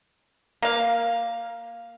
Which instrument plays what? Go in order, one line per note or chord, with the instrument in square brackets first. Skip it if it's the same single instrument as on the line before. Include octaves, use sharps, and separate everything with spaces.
[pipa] A#3 F5